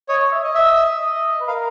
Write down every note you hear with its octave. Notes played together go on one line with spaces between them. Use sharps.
C#5 D#5
C#5
E5
D#5
D#5 E5
D#5
B4
A#4 F5